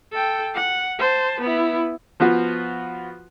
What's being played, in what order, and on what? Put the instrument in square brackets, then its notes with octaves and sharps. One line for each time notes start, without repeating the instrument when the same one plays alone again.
[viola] A4 G5
F#5
C5 A5
B3 E4
[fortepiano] F3 B3 F4 F#4